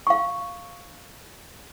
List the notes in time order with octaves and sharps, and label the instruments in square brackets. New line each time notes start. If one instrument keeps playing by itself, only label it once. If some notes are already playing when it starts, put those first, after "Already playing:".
[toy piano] F5 C#6